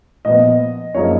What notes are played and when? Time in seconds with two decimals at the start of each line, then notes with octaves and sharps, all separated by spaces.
0.25 A#2 F3 B3 D#5
0.94 F#2 F3 A#3 D#4 G#4 C#5